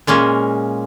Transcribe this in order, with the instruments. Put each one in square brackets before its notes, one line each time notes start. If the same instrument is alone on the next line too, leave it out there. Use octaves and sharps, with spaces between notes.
[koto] A#2 G#3 A#3 C#4